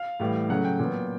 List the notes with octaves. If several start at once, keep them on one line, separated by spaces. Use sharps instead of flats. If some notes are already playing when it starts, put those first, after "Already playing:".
Already playing: F5
A2 E3 G3
C#3 F#3 A3 F#5
G5
A#2 F#3 B3